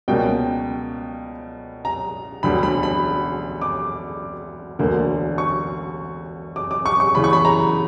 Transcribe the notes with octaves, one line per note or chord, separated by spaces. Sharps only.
C#2 B2 G3 A#3 C#4 G5
A#5
E1 D2 D3 G3 B5
B5
B5
D6
E1 D2 D3 A#3
C#6
D6
D6
C#6
C#6
E2 C#3 E3 B5
C#6
B5
A#5